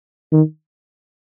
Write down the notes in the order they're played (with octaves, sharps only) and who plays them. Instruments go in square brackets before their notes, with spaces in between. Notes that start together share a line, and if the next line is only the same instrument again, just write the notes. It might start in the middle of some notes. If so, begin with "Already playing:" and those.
[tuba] D#3